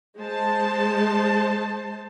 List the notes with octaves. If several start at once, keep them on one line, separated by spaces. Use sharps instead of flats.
G#3 C5 A5